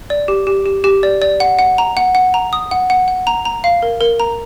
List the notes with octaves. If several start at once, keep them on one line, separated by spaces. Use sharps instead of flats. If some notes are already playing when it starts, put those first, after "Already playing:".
D5
G4
G4
G4
G4
D5
D5
F#5
F#5
A#5
F#5
F#5
A#5
D#6
F#5
F#5
F#5
A#5
A#5
F5
A#4
A#4
A#5